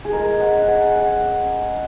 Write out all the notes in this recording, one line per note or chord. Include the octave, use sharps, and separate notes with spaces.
G#4
G#3 A#4
F#5
C#4
F#5
G#5
G#3 F#5
C#4